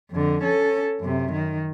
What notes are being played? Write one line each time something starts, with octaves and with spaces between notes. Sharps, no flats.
F2 D3
C#4 A4
F#2 C3
D#3